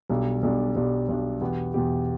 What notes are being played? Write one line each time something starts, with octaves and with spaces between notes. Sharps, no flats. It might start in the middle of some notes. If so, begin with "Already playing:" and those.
B1 B2 G3 D4
B1 B2 G3 D4
B1 B2 G3 D4
B1 B2 G3 D4
E2 B2 B3 G4
E2 B2 B3 G4